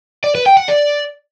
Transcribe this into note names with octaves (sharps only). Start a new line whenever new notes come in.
D5
B4
G5
F#5
D5